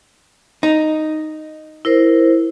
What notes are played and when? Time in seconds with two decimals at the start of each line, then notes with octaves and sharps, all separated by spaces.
0.63 D#4
1.85 E4 A#4 C5